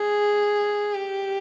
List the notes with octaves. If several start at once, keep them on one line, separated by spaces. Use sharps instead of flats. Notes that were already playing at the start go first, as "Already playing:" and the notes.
Already playing: G#4
G4